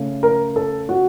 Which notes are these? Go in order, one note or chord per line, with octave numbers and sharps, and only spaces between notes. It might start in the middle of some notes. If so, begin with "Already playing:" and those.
Already playing: C#3 A3
A#4
A4
F#4